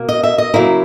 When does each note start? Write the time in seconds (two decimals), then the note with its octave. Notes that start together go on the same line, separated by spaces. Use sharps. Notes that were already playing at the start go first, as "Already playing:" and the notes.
Already playing: B2 A#3
0.09 D#5
0.23 E5
0.38 D#5
0.54 C#3 F#3 A#3 E4